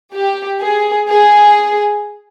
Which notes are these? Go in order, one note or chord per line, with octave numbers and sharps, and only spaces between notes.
G4
G#4
G#4